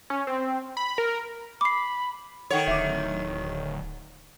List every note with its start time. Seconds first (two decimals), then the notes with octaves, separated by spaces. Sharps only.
0.10 C#4
0.27 C4
0.77 B5
0.98 A#4
1.61 B5 D6 C7
2.50 D#3 A4 C#5 F#5 G5
2.67 D1 E5 D6